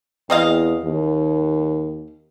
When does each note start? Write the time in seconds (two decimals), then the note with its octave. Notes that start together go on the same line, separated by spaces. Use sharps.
0.30 E2 C4 D#5 F5
0.84 D#2